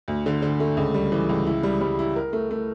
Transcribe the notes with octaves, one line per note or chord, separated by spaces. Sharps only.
D2
D3
D3
A3
C#2
G3
E3
C#2
E4
G3
G3
E4
A#4
A3
A3